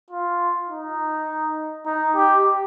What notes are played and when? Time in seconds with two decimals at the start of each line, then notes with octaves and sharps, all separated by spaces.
0.10 F4
0.69 D#4
1.86 D#4
2.16 G4